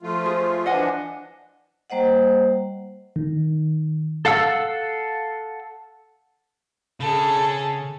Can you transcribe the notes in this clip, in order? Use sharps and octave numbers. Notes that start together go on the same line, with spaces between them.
F3 A3 F4
G#4
E3 F3 D4 D#5 F#5 G#5
G3 A#3 C5 D#5 F#5
D#3
A4 F5 F#5 E6
C#3 G#4 A4 B5